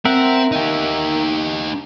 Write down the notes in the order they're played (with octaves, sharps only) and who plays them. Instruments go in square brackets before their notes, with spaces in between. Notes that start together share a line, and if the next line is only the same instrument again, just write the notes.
[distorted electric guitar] C4 [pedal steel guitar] A#4 E5 F#5
[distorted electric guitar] D#4 G4